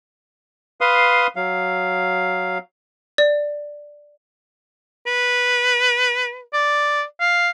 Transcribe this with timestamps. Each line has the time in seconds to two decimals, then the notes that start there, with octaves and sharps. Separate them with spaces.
0.81 B4 F5 C6 D#6
1.36 F#3 F5
3.18 D5
5.07 B4
6.53 D5
7.20 F5